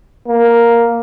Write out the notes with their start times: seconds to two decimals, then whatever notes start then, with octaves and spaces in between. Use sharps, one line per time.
0.28 A#3